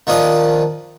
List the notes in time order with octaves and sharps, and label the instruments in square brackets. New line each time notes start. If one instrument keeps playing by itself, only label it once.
[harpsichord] D#3 F3 D4 D#6